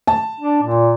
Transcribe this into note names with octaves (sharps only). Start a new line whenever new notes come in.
A5
D4
A#2